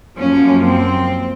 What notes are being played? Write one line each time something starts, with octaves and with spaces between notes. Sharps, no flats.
F#2 F3 A#3 C#4
C4